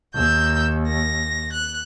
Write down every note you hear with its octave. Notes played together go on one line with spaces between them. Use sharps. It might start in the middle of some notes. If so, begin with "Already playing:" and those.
D#2 E6 G6
A#6
F#6